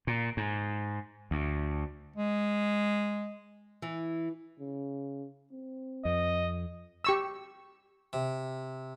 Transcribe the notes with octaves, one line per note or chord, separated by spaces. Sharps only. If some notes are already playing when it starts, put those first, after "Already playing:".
A#2
G#2
D2
G#3
E3
C#3
C4
F2 D#5
G4 C#6 E6
C3